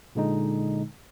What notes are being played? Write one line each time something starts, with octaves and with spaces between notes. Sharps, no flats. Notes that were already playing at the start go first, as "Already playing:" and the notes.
A#2 D3 G#3 D#4